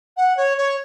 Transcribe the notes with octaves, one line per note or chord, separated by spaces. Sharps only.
F#5
C#5
C#5